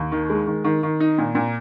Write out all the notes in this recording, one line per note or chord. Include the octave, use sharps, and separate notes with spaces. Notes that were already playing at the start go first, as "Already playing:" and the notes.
Already playing: D#2
D#3
G#3
D#3
D#3
D#3
D#4
A#2
A#2